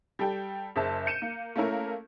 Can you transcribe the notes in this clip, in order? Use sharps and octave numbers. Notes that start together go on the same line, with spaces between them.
G3 A4 G5
F#1 G#4 C5 E5 A5
G6 C#7 D#7 E7
A#3
A3 A#3 C#4 E4 A#4